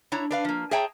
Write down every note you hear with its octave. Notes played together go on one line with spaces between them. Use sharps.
D4 E4 C#5 A#5
D4 B4 F5
F3 A#3
G#4 C#5 E5 G5 A5 A#5